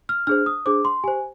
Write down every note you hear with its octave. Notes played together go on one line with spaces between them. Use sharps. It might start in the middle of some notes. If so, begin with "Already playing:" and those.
F6
D4 G#4 C5 F6
D#6
D4 G#4 C5 D6
C6
G4 C5 G#5